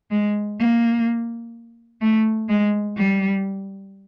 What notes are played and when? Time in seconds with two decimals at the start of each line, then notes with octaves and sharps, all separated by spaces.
0.11 G#3
0.59 A#3
2.01 A3
2.49 G#3
2.97 G3